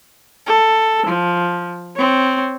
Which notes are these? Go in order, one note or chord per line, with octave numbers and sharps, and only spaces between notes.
A4
F3
C4 C#5